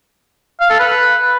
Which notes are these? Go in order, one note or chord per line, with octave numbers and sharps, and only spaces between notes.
F5
A4
B4